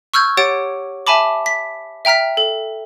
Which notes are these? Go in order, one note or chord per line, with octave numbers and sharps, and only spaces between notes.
C#6 E6 F6 G6 G#6
G4 C#5 F#5 A6 D7
E5 G#5 A5 B5 D6
B6
E5 G5 A#5 F6 B6
A4